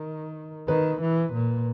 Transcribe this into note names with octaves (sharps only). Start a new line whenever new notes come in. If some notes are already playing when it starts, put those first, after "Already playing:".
Already playing: D#3 A#4
D#3 B4
E3
A#2